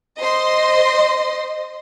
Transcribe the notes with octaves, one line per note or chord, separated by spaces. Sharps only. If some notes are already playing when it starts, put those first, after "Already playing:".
C5 D#5 C6